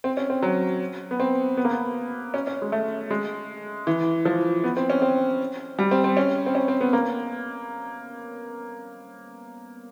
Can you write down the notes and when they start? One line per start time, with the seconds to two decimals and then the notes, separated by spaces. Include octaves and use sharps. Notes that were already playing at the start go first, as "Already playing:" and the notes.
0.04 C4
0.17 C#4
0.30 C4
0.42 F#3
1.11 B3
1.20 C4
1.57 B3
1.65 A#3
1.71 B3
2.34 C#4
2.47 C#4
2.62 G#3
2.72 A3
3.11 G#3
3.87 E3
4.25 F3
4.64 B3
4.77 C4
4.90 C#4
5.02 C4
5.79 G3
5.91 C4
6.04 C4
6.17 C#4
6.46 C4
6.55 C#4
6.68 C4
6.81 B3
6.93 A#3